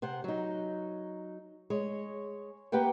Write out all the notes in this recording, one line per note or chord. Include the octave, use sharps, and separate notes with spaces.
C3 C5 F#5
F#3 D#4
G#3 C#5
A#3 G4 B4 F#5 G5